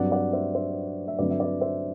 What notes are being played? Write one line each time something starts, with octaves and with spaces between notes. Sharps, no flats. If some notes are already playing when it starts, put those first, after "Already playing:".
Already playing: G2 F#3 C4 D5 F#5
D5 F#5
C5 E5
C5 E5
E5
G2 D3 F#3 A3 C4 B4 D5
E5
B4 D5
C5 E5